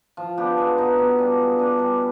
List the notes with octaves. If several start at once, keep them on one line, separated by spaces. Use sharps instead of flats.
F3
B3 D4 G4
G#3
B3 D#4 B4
B2
G3 D4 F4
G#3
D4 G#4 B4
G3